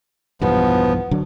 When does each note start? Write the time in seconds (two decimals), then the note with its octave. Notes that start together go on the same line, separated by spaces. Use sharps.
0.42 B1 E2 G2 F3 B3
1.11 D3 F#3 D4